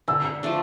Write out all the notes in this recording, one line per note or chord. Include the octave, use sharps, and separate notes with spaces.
D3 E6
F3 A3 D4